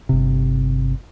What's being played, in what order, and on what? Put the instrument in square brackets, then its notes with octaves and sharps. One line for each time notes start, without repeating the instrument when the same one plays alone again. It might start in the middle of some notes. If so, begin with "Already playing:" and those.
[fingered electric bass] G1 C3